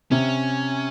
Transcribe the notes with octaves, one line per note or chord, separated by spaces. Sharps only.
C3 C#4